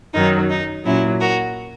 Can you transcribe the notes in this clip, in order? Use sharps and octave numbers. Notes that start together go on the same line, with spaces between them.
F#2 D#3 F#3 D#4
D#4
A#2 F#3 C#4 E4
F#4 A#4